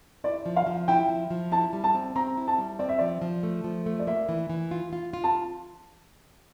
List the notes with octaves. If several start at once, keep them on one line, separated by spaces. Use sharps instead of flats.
E4 D5
F3
F5
F3
E4 G5
F3
F3
E4 A5
G3
A5
C4
C4 A#5
E4
A5
G3
C4 D5
E5
F3 D5
F3
A3
F3
A3
D5
A#3 E5
E3
E3
F4
F4
F4
A5